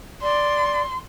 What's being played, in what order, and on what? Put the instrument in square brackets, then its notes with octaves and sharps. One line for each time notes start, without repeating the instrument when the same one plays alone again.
[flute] D5 [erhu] C6